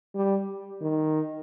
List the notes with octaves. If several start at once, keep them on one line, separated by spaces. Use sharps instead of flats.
G3
D#3